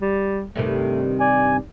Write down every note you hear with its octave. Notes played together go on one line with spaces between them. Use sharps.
G3
G2 C3 D#3 A3
D5 G#5